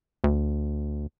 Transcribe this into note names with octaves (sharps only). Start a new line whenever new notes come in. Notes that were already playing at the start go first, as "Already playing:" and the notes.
D2